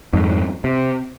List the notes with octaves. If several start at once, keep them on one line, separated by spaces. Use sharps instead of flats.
F2 G#2
C3